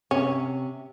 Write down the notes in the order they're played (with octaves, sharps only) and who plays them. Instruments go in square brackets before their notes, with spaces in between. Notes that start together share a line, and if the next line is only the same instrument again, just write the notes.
[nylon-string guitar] C3 [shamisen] C#4